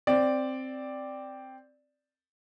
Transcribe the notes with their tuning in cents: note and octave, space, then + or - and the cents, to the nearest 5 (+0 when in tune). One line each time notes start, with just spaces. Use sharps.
C4 +0 D5 +0